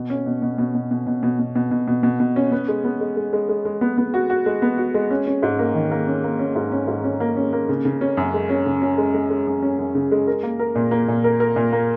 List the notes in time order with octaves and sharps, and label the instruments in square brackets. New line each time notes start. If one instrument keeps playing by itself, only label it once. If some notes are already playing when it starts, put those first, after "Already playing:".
Already playing: [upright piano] B2
C#4
B2
B2
B2
B2
B2
B2
B2
B2
B2
B2
B2
B2
B2
C#4
B3
G#3
B3
G#3
G#3
G#3
G#3
G#3
B3
B3
F#4
F#4
G#3
B3
F#4
G#3
C#4
C#4
G#2
A#3
D#3
A#3
C#4
A#3
C#4
G#2
C#4
G#2
C#4
A#3
C#4
A#3
C#3
C#3
C#4
F#2
G#3
C#4
C#3
C#4
G#3
G#3
G#3
F#2
C#4
F#2
C#3
G#3
A#4
A#3
A#4
A#2
A#3
A#2
A#4
A#4
A#2
A#3